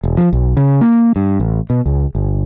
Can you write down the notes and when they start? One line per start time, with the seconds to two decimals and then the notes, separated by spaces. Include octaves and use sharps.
0.04 E1
0.17 F3
0.33 B1
0.57 C#3
0.81 A#3
1.16 G2
1.40 A1
1.70 B2
1.86 C#2
2.15 G1